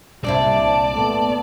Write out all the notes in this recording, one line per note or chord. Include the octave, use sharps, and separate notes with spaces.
C2 A#2 C4 D4 E4 D5 A5
A3 B3